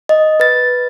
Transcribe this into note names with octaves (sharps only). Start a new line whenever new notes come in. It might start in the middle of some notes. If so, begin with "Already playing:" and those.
D#5
B4 A6